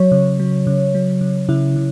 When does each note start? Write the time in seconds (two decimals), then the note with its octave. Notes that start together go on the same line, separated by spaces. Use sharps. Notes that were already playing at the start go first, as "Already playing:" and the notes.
Already playing: F#3 C#5
0.12 C#3
0.39 F#3
0.67 C#3
0.95 F#3
1.21 C#3
1.49 C#3 E4
1.76 C#3